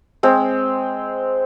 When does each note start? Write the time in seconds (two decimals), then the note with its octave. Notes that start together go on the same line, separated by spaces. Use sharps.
0.23 G#3 C4